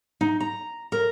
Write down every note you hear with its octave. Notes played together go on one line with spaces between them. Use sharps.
D#4
A#5
A#4